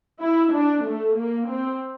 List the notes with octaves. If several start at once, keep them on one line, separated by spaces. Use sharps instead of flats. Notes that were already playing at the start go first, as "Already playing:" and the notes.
E4
D4
A3
A#3
C4